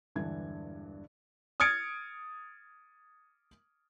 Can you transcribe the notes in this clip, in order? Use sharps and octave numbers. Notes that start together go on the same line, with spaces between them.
E1 G2 D3 E3 G#6
D#6 F6 G#6 A6 C#7 D7